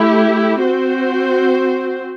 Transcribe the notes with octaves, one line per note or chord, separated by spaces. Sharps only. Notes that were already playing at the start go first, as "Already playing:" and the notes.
Already playing: A3 E4 G4
C4 F#4 C5